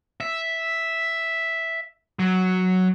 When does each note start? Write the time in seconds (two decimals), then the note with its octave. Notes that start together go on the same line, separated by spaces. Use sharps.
0.21 E5
2.19 F#3